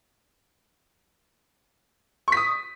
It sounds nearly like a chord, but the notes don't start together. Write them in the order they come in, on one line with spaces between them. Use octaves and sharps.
C#6 B6 D#6